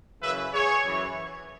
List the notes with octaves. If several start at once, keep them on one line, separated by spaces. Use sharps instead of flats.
F#2 C#3 E3 B4 E5
G#4 C#5
F#2 E3